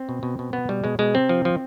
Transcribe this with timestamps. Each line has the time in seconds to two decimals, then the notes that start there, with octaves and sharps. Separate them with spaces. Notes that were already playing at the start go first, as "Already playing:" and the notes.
Already playing: C4
0.09 B2
0.23 B2
0.39 B2
0.53 B2 B3
0.69 B2 G3
0.84 B2 G#3
0.99 B2 G#3
1.14 C3 C4
1.29 F3
1.45 F3